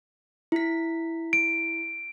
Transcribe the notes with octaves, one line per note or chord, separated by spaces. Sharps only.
E4 B6
D7